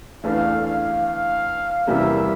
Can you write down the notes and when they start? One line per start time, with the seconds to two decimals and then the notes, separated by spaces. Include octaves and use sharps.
0.24 E2 E3 A3 D4 F5
0.65 F5
1.06 F5
1.87 E2 C3 E3 G3 A#3 E5